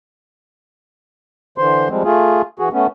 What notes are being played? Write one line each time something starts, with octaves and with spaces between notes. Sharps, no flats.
D3 E3 C5 C6
F3 G3 G#3 C4
A3 F4 G#4
E3 F#4 G#4
A3 B3 C#4